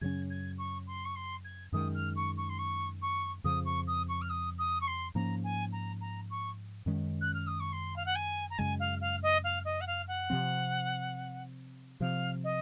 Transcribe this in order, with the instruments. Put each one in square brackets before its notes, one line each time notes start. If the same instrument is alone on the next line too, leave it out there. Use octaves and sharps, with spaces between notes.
[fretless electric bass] F#2 C#3 F#3 C#4 [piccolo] G#6
[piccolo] G#6
C#6
C6
C#6
C6
G#6
[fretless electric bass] F#2 D#3 G#3 [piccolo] D#6
[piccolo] F6
C#6
C#6
C6
C#6
C#6
[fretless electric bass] F2 C#3 F3 [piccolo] D#6
[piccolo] C#6
D#6
C#6
F6
D#6
D#6
C#6
C6
[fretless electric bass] G#2 F3 A#3 C#4 [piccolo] A#5
[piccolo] G#5
A#5
A#5
C#6
[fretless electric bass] F#2 D#3 G#3 C#4
[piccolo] F#6
F6
D#6
C#6
C6
F5
F#5
G#5
A#5
[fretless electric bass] F#2 C#3 G#3 [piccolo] G#5
[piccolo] F5
F5
D#5
F5
D#5
F#5
F5
F#5
[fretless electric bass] C3 F3 C4
[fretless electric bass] C3 F3 C4 [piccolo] F5
[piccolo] D#5